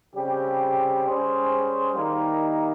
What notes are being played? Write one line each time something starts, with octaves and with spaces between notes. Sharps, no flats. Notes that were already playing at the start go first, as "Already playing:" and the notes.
C#3 G3 C4 G4
G3 C#4 G#4 C5
D#3 G3 A#3 D#4 A#4